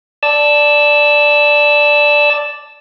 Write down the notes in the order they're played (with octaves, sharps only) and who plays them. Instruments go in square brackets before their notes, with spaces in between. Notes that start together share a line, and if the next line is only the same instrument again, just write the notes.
[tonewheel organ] D5 A5 E6